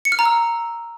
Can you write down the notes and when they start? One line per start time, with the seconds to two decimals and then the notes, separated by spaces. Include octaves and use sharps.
0.05 C#7
0.12 F6
0.19 A#5
0.25 E6